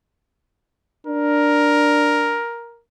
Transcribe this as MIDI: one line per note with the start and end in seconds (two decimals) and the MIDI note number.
1.07 2.41 62
1.07 2.81 70